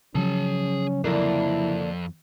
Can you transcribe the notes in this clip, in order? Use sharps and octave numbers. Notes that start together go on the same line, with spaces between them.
C#3 F3 F#3 C#4 G#4 A5
F2 D3 A#3 E4